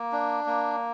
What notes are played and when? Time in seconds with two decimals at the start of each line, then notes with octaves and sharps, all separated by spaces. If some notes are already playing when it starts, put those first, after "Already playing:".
Already playing: A#3
0.12 D4
0.46 A#3